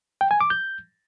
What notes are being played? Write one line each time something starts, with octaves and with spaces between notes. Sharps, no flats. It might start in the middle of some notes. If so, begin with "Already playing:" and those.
G5
G#5
D6
G6